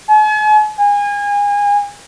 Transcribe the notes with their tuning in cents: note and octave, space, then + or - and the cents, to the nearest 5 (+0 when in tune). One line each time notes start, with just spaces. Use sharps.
G#5 +45
G#5 -30